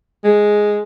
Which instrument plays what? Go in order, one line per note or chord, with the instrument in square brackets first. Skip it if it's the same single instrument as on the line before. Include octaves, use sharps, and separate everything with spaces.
[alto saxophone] G#3